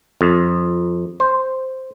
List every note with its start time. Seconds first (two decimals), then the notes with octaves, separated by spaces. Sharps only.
0.21 F2
1.20 C5